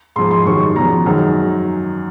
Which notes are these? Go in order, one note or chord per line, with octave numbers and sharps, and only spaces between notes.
G#2 F3 G#3 C6
C6
F#2 D#3 G3 C#6
E2 C#3 F3 A#5
F#2 D#3 G#3